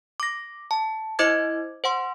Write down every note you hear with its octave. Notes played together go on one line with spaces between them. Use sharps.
D6 A#6
A5
E4 C5 D#5 D6 G#6
C5 F#5 C6